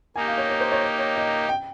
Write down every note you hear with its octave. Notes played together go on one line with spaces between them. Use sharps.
A#3 D#4 G4 G#5
F5
C#5
C#5
C5
C#5
D#5
C#5
D#5
G5